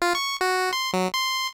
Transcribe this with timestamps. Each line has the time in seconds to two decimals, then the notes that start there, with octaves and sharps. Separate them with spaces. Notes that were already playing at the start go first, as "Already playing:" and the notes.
0.02 F4
0.15 C#6
0.41 F#4
0.73 C6
0.93 F#3
1.14 C6